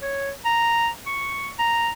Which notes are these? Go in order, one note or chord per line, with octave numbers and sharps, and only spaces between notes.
C#5
A#5
C#6
A#5